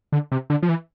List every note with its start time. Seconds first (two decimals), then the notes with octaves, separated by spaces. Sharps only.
0.12 D3
0.32 C3
0.50 D3
0.63 F3
0.69 E3